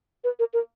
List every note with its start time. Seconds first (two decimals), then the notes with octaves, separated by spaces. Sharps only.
0.24 B4
0.39 A#4
0.53 A#4